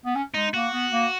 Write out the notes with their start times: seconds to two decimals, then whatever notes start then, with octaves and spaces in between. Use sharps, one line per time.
0.05 B3
0.15 C#4
0.34 G#3 D#4
0.54 A#3 F#4
0.73 B3
0.92 A#3